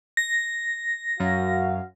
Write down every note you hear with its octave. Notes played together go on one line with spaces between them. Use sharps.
A#6
F#2 F#4 F5